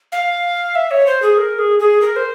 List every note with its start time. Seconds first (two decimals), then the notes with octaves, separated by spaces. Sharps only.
0.12 F5
0.75 E5
0.91 C#5
1.07 C5
1.22 G#4
1.38 A#4
1.59 G#4
1.79 G#4
2.01 A#4
2.16 C5